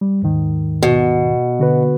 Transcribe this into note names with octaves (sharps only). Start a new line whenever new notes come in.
G3
D#2 G#2 D#3
B2
D3 F#4 B4